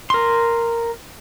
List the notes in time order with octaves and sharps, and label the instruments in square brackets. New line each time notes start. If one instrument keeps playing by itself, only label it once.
[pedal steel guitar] A#4 C6